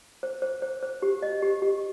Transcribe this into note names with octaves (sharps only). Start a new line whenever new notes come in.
C5
C5
C5
C5
G4
D#5
G4
G4